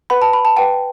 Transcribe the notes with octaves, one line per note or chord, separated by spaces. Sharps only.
B4 F#5 B5
A5
B5
A5
B4 F#5 G5